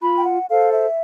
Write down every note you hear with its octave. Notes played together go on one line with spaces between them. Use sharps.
F4 B5
G5
F#5
A4 C5 F5
E5